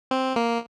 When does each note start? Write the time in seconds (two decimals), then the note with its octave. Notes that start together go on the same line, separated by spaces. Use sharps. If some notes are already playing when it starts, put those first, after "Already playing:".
0.11 C4
0.36 A#3